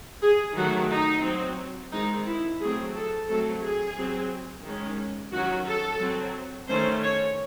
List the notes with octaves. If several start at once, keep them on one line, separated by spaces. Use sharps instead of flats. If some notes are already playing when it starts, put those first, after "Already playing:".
G#4
D#3 F#3 A3 F#4
D#4
F#3 C4
D#3 G#3 C4 D#4
E4
F#3 A3 C4 G#4
A4
F#3 A3 C4 A4
G#4
F#3 C4
D#3 G#3 C#4
D#3 F#3 C#4 F#4
A4
F#3 C4
D#3 A3 C#4 C5
C#5